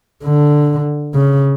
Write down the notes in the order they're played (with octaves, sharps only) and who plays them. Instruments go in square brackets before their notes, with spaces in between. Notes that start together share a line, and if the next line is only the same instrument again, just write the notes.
[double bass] D3
C#3